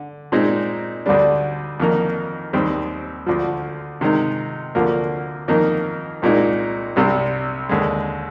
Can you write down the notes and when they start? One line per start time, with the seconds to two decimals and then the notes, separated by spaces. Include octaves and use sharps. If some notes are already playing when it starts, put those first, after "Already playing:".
Already playing: D3
0.32 A#2 G#3 C4 D#4
1.06 D2 D3 G3 D4
1.80 F2 D#3 A#3 D#4
2.53 D#2 D#3 G3 C4
3.26 D2 D3 F3
4.01 C3 D#3 G#3 D#4
4.75 D2 D3 F3 A#3
5.48 F2 D#3 A#3 D#4
6.22 C2 A#2 G#3 D#4
6.96 C2 C3 G3 D4
7.69 D#2 D3 G#3